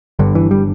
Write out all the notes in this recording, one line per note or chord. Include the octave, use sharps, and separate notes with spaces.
G1 G2 D3
E3
G3